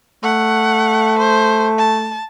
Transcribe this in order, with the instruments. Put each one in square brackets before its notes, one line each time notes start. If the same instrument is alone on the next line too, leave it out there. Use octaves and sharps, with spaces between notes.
[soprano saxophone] A3 [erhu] F#5
[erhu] C5
A5